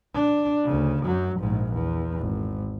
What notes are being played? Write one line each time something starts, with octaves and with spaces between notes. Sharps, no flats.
D4
D2 C#3
F#2 F#3
A#1 G#2
E2
G#1